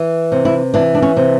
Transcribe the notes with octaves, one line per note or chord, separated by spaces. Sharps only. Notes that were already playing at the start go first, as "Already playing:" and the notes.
Already playing: E3
C3
E4
E3 D4
D4
C#4
C3